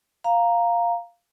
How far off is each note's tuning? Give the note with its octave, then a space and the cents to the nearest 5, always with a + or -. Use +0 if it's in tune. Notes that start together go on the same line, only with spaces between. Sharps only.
F5 +0 A#5 +0